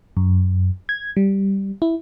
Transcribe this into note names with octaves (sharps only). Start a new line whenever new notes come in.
F#2
G#6
G3
E4